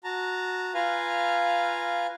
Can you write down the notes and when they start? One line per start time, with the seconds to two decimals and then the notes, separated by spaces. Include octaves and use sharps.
0.04 F#4 A5 A#5
0.74 F4 B4 F5 G#5 A#5